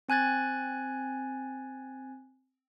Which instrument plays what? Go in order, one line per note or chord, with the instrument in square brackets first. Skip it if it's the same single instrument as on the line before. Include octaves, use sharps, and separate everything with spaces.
[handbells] C4 G#5 F#6 G#6 A6